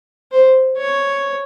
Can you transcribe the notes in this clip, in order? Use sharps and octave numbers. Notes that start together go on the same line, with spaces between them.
C5
C#5